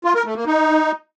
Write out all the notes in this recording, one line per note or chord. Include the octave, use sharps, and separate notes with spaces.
F4
A#4
A3
A#3
D#4